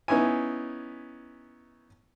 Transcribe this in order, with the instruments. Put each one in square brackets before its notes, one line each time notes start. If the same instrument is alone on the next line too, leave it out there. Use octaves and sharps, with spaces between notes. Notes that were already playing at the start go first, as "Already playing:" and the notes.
[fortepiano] B3 C#4 D#4 E4 G#5